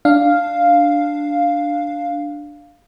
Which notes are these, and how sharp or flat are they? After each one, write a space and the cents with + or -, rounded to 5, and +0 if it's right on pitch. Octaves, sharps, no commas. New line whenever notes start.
D4 +0 F5 +0